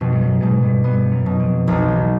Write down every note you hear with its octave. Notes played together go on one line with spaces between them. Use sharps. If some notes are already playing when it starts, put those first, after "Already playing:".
F2 B2
G2
F#2
G#2 B2
G2
G2 B3
F#2
B2
F2
B1 F2
E2